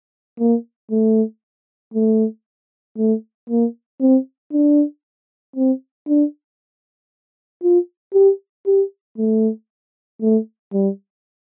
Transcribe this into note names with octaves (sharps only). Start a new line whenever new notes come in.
A#3
A3
A3
A3
A#3
C4
D4
C4
D4
F4
G4
G4
A3
A3
G3